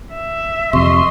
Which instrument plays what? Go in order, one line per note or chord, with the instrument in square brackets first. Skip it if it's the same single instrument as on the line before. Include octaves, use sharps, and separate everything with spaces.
[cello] E5
[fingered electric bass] F2 C3 [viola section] D#5 C6 [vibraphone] C#6